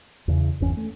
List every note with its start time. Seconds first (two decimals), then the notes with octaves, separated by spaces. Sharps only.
0.28 E2 C#3
0.60 G1 E2 C#4
0.77 A3